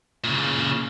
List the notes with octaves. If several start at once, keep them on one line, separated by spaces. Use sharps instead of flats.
A#2 C#3